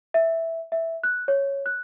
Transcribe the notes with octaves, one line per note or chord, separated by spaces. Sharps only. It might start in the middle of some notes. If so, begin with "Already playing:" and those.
E5
E5
F#6
C#5
F#6